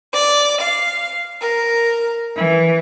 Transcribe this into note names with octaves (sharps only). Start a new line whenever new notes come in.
D5
F5
A#4
E3